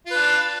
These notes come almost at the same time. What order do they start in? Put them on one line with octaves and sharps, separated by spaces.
F4 B4 D4